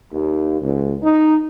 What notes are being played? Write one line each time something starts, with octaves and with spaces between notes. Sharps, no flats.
D#2
C#2
D#4